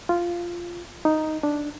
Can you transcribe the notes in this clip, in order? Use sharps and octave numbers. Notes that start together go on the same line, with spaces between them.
F4
D#4
D4